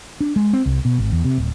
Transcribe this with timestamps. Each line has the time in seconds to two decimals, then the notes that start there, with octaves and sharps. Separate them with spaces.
0.21 D4
0.36 G#3
0.53 C4
0.66 C2
0.85 B2
0.98 G#1
1.12 E2
1.25 C3
1.38 D1